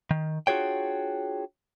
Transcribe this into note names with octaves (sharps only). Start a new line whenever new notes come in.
D#3
D4 F4 F#4 G#4 C#5 G5